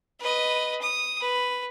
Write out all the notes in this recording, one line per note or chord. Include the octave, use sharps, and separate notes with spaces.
B4 D#5
D#6
B4